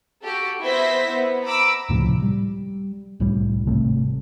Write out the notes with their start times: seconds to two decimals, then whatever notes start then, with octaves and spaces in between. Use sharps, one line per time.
0.22 F#4 G4 A4
0.62 B3 E4 C5 E5 A#6 B6
1.10 B3
1.44 A#5 B5 D6 E6
1.89 C#2 A2 C3 F3
2.22 G3
3.20 C2 A2 G3
3.67 G#1 C3 G3 A3